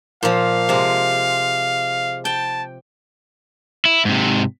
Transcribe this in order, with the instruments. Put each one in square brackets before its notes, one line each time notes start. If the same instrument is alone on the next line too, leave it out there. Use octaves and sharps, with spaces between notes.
[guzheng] A#2 F3 [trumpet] F5
[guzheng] C3 G#3
[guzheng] G5 [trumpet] A5
[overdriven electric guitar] E4
G#2 C3